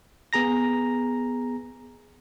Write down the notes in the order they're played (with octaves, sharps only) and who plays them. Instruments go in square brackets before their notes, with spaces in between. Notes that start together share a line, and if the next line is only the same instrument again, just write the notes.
[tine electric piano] B3 G#4 A#5 A#6